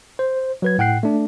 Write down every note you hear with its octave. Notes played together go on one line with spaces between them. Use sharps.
C5
F#3 B4 G#6
A2 F#5 G5 F#6 C7
A3 D4